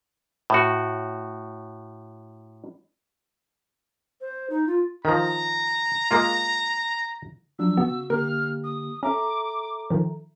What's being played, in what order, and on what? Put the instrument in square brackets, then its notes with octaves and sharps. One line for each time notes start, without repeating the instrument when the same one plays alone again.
[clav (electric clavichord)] A2 F#4
[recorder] C5
D#4
F4
[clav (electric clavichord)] D#3 F3 [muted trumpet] A#5
[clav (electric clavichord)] G#3 A#3 F4
[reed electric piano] F3 F#3 D4 [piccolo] E6
[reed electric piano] C#3 F#4 [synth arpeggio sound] B3
[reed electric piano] D3 A#3 G4 [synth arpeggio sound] A#4 [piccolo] F6
[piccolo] D#6
[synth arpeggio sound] C#4 [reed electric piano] A4 E5 A#5 [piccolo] D6
[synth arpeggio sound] D#3 F3